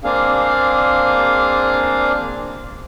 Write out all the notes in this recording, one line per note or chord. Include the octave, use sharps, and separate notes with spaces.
A#3 C4 D4 G#4 F5